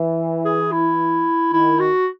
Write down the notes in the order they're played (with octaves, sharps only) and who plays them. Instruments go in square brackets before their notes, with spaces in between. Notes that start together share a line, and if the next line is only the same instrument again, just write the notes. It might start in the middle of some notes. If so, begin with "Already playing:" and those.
Already playing: [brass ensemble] E3
[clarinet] G#4
E4
[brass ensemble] D#3 [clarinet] E4
[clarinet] F#4